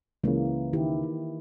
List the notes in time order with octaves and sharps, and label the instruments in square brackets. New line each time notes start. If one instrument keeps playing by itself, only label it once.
[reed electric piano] C#2 C#3 [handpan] E3 A#3
[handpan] D#3 E4 G4